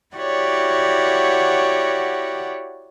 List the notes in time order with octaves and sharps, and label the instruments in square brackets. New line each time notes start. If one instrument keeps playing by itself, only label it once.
[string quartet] E4 F#4 G4 C#5 D5 F#5